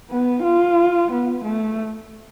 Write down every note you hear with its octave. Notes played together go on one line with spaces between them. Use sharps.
B3
F4
B3
A3